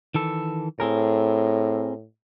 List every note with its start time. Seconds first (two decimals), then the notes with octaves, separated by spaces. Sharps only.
0.15 D#3 E3 A4
0.80 A2 C4 G#4 A#4